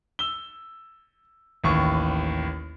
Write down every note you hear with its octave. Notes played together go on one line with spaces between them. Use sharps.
E6 G7
A1 D#2 C#6